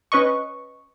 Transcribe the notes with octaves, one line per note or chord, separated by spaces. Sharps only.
C#4 B4 D#5 C#6